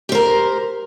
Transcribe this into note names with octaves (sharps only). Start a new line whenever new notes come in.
G4 A#4 C5